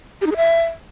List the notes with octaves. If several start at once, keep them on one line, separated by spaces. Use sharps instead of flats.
G4
D#4
G#4
E5